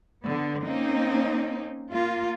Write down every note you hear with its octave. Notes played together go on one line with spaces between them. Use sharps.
D3 B3
A#3 C4 C#4 D#4
A#3 F4